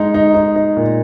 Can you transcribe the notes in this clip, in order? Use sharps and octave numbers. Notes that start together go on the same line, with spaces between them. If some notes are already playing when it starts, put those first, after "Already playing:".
Already playing: G#3 D#4
D#4
D#4
D#4
A#2